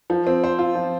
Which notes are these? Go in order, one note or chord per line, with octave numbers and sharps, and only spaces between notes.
F3
C4
C5
F4
F3